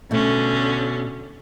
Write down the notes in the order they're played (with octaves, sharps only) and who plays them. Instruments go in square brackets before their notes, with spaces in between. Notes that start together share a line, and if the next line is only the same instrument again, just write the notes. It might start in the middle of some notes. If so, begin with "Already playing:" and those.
[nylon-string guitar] B2 A3 [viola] D3 C#4